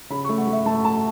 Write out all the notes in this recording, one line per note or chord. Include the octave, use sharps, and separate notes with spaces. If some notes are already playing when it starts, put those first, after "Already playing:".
C#3 B5
A3 C#6
F#5
A3
E5
A3 A5
A3 A5